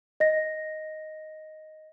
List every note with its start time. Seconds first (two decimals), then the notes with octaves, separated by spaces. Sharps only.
0.20 D#5 A#6